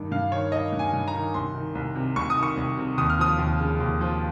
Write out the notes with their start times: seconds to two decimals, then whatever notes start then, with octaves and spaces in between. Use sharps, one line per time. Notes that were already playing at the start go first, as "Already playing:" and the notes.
Already playing: G2 D#3
0.11 G2 F5
0.31 D#3 C#5
0.52 D#3 D#5
0.72 G2
0.79 G#5
0.93 G2
1.08 A#5
1.14 D#3
1.34 C2 C6
1.55 D#3
1.75 C2
1.95 C3
2.16 C2 C#6
2.30 D#6
2.37 D#3
2.43 C#6
2.57 C2
2.77 C3
2.98 D#2 D#6
3.10 F6
3.19 F3 D#6
3.38 D#2
3.59 C#3
3.80 D#2
4.01 F3